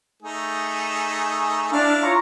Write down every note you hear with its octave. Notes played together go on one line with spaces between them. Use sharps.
A3 D#4 G#4
D4 E4 F5 D6
F4 C#5 A#5